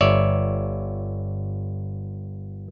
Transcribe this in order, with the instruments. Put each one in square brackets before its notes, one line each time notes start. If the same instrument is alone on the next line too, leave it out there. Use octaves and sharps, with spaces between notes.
[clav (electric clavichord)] G1 C#5 D5 E5